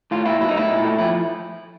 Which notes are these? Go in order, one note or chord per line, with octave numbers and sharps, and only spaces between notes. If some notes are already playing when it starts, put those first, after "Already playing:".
A2 F4
A#3 E4
F#3 E4
D#4
A2 E4
A#2
A3
F3 E4